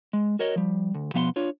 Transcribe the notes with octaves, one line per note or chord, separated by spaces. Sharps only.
G#3
F#4 A#4 C#5 D#5
F3 G3
D2
B2 F3 B3 F5 F#5 C6
D4 F4 C#5